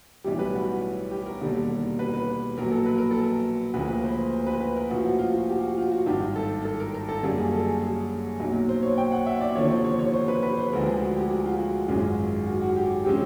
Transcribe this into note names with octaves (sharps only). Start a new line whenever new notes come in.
B1 A2 E3 G3 G4
B4
F#4
G4
A#4
E1 D#2 D3 G3
B4
B4
A#1 A#2 F#3 A#4
A4
B4
A#4
A4
A#4
D2 C#3 F3 A#3 B4
B4
C5
C5
B4
B4
A#4
A#1 A2 F3 A#3 F#4
F#4
F4
F#4
G4
F#4
F4
F#4
G#1 G2 D#3 G4
A4
A4
A#4
A#4
A4
F#2 D3 G3 A#3 C#4 G#4
G#4
A4
G#4
G#4
B1 A#2 F#3
C5
C#5
G5
F#5
E5
D5
F1 D#2 D3 F3 C#5
C5
C#5
C#5
C5
B4
B4
C5
D2 D3 F3 G#3 A#4
G#4
F#4
G4
F#4
F4
F#4
G#1 F#2 D#3 G#3 C#4 F4
F#4
F#4
G4
C3 F3 G#3 C#4 G4